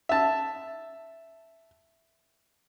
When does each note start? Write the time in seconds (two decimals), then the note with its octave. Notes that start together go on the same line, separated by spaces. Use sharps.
0.09 E5 A5